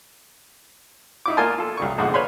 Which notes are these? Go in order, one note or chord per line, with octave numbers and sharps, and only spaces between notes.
D#4 E4 D6
A#3 F4 A#4 G#5 A5 D#6
F4 A4
C2 C#3 C#6
A#1 G#2 D3 G#3 F#5
B4 C#5 F5 B5 C6